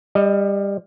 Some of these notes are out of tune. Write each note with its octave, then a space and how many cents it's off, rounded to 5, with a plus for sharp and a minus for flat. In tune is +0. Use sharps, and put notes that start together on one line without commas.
G3 +20 D#5 +0